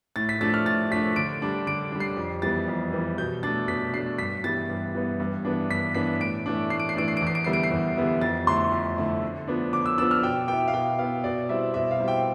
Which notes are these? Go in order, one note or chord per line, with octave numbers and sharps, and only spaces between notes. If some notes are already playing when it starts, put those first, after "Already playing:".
A2 A6
B6
F3 A3 D4 A6
F6
A2 A6
F3 A3 D4 B6
D3 D7
G3 D4
D3 D7
G3 D4
C7
F2
E3 G3 B3 A6
F2
E3 G3 B3
B2 G6
A3 D4 A6
B2 B6
A3 D4 C7
G2 B6
E3 G3 B3 A6
G2
E3 G3 B3
G2
E3 B3 D4
G2 B6
E3 B3 D4 B6
A2 D7
E3 A3 D4
A2 C7
D7
C7
E3 A3 D4 D7
C7
D7
E2
C7
D7
D3 G3 B3 E4 C7
D7
C7
E2
D3 G3 B3 E4
F2 A6
D3 A3 E4 C6
F2
D3 A3 E4
D3
F3 B3 D4
D3 D6
E6
F3 B3 D4 E6
F6
B2 G5
B3 E4 G5
F5
B2 G5
B3 E4 F5
B2 D5
G3 C4 E4 E5
B2 E5
F5
G3 C4 E4
G5